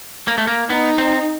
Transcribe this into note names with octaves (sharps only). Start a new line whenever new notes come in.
A#3
A3
A#3
B3 D#4
C4